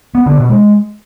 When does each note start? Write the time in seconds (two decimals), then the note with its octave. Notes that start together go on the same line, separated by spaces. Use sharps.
0.15 B3
0.26 D3
0.38 B2
0.49 G#3